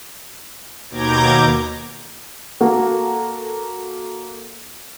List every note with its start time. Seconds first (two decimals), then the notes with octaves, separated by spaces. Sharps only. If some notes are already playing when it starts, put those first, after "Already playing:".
0.90 D#2 B2 A#5 D6 G6 G#6
2.61 A#3 F#4 A4